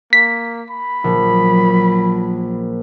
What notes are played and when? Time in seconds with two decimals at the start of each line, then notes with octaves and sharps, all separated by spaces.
0.13 A#3 B6
0.70 B5
1.04 A#1 F#3